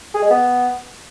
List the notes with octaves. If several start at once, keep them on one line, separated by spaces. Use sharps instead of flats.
G#4
G#3
B3